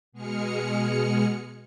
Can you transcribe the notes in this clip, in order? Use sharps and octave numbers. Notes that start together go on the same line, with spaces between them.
B2 G#3 G#4 F6 C#7